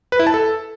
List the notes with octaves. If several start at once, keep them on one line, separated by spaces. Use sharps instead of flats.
B4
E4
A5
A4